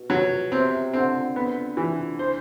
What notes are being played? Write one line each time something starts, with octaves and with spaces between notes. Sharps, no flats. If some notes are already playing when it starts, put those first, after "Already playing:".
Already playing: B2
F#3
C3 C4
D3 C4
B3
E3
C5